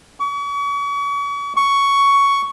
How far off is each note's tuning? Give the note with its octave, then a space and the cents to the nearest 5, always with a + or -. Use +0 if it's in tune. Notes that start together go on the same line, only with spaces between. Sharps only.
C#6 +40
C#6 +10